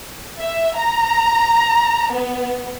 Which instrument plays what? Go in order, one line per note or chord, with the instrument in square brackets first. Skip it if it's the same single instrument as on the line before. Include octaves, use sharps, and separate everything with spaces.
[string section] E5
A#5
B3